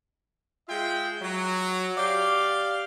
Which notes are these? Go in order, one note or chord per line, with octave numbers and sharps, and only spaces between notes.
G#3 F4 G#4 E5 G5
F#3
G4 D5 F5